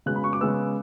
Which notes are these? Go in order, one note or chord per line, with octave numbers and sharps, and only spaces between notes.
C#3 G#3 B3 F#6
B5
C#6
D6
C#3 G#3 B3 E6